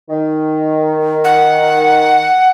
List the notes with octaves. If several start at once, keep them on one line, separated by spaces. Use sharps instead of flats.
D#3
F#5